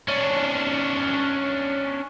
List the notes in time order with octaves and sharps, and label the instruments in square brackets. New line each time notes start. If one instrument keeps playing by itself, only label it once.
[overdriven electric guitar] C#4 D4